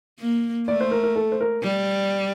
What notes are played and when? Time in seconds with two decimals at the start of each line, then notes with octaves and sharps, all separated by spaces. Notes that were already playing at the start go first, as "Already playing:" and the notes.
0.20 A#3
0.68 A3 D5
0.81 C5
0.91 A#4
1.03 A#4
1.16 A4
1.32 C5
1.41 A#4
1.64 G3